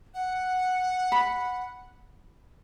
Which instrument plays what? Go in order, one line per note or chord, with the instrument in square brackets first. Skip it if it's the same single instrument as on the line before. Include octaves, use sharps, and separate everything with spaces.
[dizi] F#5
[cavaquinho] B5